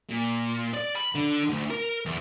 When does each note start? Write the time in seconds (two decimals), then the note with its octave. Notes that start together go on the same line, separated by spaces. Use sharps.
0.09 A#2
0.74 D5
0.95 B5
1.15 D3
1.50 D2
1.71 A#4
2.06 E2